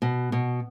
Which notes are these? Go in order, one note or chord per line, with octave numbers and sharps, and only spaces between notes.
B2
B2